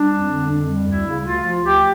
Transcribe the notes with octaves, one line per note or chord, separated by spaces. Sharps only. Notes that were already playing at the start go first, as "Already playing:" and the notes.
Already playing: G3 D4
F2
D3
F2
G3
D2 E4
C#3
D2 F4
F3
D2 G4